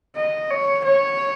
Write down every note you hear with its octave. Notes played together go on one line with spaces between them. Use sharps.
D#5
C#5
C#5